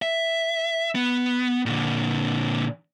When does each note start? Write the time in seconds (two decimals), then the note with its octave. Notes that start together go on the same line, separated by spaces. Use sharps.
0.02 E5
0.95 B3
1.66 A#2 D3